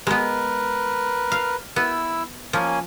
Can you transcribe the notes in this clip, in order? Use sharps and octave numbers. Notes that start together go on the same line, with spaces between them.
G#3 B3 A#4 B4
F5
B3 E4 E6
F3 A#3 C#4 G#5